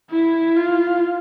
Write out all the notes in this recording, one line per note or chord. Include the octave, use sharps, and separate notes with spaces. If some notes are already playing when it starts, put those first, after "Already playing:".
E4
F4